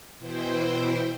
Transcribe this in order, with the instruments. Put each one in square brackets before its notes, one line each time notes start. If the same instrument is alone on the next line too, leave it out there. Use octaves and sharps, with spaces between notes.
[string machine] B2 E3 E4 C5 G5